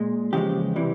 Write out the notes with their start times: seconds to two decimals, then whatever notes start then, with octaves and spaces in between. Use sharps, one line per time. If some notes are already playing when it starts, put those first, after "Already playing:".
Already playing: A#2 G#3
0.33 E2 C#3 F3 G#3 G4
0.76 C3 E3 G3